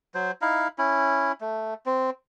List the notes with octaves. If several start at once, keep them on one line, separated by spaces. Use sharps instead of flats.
F#3 C5
D#4 E4 F5
C#4 E4
A3
C4